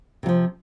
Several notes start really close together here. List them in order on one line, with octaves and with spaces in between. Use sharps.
C3 F#3 F3